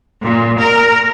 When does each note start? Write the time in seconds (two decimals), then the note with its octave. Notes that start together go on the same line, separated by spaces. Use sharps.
0.22 A#2
0.59 A#4